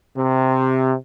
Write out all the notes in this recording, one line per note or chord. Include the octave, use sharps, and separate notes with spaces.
C3